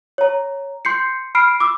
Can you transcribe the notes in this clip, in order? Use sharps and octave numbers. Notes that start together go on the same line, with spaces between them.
C#5 A#5
C6 G6 C7 C#7
B5 F6 C7 D7
D6 E6